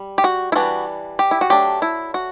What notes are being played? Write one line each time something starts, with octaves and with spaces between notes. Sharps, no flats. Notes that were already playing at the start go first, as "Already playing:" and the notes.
Already playing: G3
G4
F#4
E4
E3 G3 D4 F#4
G4
E4
F#4
F#3 A3 D4 G4
E4
F#4